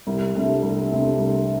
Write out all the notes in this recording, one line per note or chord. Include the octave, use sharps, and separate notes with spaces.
C2
C3 A3 D4
C2
C3 A3 D4
C2